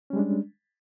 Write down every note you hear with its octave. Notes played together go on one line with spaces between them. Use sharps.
G3 G#3 C#4 D4